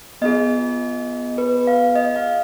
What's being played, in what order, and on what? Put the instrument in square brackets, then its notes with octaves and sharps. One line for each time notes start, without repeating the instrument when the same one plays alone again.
[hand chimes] B3 F4 G#4 D#5
B4
F5
D#5
F5